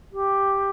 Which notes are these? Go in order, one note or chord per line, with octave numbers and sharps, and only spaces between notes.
G4